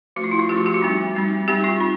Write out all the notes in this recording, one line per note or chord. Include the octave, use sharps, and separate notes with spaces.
F3 A3 C#4 F#4
F4
E4
F4
F3 A3 C#4 G4
F#4
G4
F#4
G3 C4 D#4
G3 C4 D#4
G3 C4 D#4 G4
F4
D#4